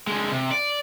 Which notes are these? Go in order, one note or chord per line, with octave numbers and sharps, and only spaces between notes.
D3 G#3
C3
D5